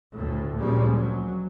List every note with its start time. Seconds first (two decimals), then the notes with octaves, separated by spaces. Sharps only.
0.13 D2 A2
0.56 D2 A#2 F3 G3 G#3 C#4
0.94 F#3